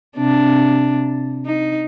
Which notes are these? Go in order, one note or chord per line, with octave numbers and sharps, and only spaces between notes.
C3 D4
D#4